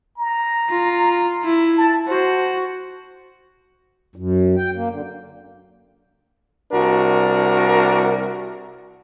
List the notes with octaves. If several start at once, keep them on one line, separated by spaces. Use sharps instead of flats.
A#5
F4
E4
A5
F#4 C5
F#2
G5
A#3
D3
C2 D4 F#4 A#4